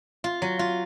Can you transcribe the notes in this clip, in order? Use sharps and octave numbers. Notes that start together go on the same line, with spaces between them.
F4
F#3
F4